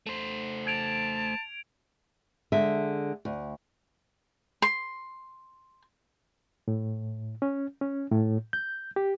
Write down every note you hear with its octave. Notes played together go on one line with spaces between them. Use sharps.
A3 C5
A5 G#6 D7 F7
D3 G#3 E5
D2
C6
A2
C#4
C#4
A2
G6
G4